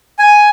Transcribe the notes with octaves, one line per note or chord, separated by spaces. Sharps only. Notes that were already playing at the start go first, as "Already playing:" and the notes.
G#5